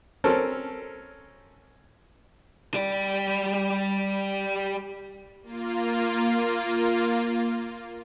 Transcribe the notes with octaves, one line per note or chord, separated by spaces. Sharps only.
C4 C#4 A4 A#4
G3 D5
A#3 F4